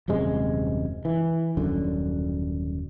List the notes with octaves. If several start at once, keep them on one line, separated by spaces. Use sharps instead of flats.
D#1 F#2 C3 G#3
E3
D#1 F#2 D3